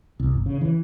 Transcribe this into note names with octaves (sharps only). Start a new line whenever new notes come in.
C2
G1
C#3
E3